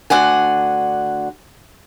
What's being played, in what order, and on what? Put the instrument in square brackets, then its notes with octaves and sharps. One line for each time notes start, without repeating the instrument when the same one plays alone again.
[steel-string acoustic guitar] D2 D4 F#5 G#5